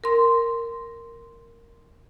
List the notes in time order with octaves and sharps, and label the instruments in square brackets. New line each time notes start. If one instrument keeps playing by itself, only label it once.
[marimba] A#4 C6